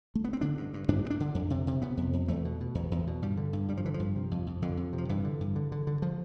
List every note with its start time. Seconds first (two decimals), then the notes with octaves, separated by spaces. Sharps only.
0.15 A3
0.24 B3
0.33 C4
0.41 D3 D4
0.57 G2
0.74 G2
0.88 G2 D4
1.04 G2
1.10 D4
1.20 D3
1.35 F2
1.50 C3
1.67 C3
1.82 C3 B3
1.97 F2
2.13 F2
2.28 E2 A3
2.45 B2
2.60 B2
2.75 E2
2.91 E2
3.07 B2
3.22 G2 G3
3.37 D3
3.53 G2
3.68 G2 G3
3.77 F3
3.85 D3 E3
3.94 F3
3.99 G2
4.16 C3
4.31 F2
4.47 F2
4.62 F2 D3
4.77 F2
4.93 C3
4.98 F3
5.09 G2 E3
5.24 D3
5.41 G2
5.56 D3
5.72 D3
5.87 D3
6.02 F3